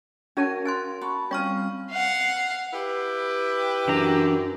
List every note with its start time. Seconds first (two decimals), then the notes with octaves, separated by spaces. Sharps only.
0.37 C#4 F#4 A#4 C#5 F5 A5
0.65 G#5 C6 F#6 A6
1.02 F#4 A5 B5 C#6
1.31 G3 C4 C#4 F4 C#5 G5 C#6 F6
1.91 F5 F#5
2.73 E4 G4 B4
3.88 F#2 E3 D4 A#5